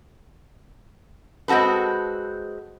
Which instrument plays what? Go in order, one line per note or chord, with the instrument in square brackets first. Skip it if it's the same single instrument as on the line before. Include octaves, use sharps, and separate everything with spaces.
[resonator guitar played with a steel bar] G#3 C4 F#4 A4 B4